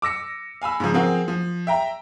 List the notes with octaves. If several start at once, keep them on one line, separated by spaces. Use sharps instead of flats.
D6 E6 A#6 C#7
F5 G#5 B5 E6
G#2 C#3 F3
F3 C4 F#4 G#4 A#4
F3
E5 G5 A#5